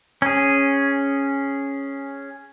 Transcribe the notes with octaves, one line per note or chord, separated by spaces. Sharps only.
C#4 G#4